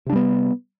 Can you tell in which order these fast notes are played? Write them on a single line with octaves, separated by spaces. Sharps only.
C3 D4 G3 B3